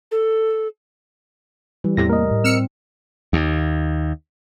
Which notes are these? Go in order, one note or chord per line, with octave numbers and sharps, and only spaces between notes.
A4
E3 G3
E2 A2 C3 A#6
A#3 A#4 D#5
A2
C4 E6 F6 C#7
D#2